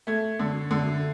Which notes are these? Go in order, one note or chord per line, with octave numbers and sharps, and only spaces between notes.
A3 G#6
D3
D3